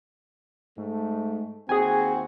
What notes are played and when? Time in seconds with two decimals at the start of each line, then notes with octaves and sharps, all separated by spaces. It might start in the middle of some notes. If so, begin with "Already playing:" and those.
0.78 G#2 A3
1.69 D#2 C4 F#4 G#4 G#5